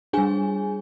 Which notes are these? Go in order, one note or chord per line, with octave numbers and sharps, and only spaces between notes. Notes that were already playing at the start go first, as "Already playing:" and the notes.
G3 D4 G#4 G#5